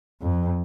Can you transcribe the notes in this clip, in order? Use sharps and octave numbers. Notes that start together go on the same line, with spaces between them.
F2